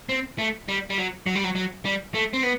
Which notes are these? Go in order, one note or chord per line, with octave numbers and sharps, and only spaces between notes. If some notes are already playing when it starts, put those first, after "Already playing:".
C4
A3
G3
G3
F#3
F#3
G3
F#3
F#3
G3
A3
C4
B3